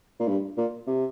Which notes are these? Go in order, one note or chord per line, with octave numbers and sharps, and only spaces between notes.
A#2
G2
A#2
C3